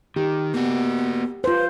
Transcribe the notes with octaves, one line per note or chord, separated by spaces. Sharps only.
D#3 G4
A#3 B3 F#4
F4 B4 C5